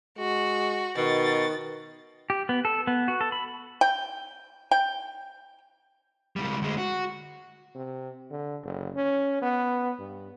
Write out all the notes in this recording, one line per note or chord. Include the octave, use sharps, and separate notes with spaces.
G#3 F#4
B2 D#3 A6
G4
B3
A4
B3
F#4
A4
B5
G5
G5
C#2 G3
D2 G#3
F#4
C3
D3
F#1
C#4
B3
G2